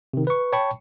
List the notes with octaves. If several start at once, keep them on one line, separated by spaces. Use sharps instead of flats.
C3 D#3
B4 C#6
C#5 G5 A5 B5 C#6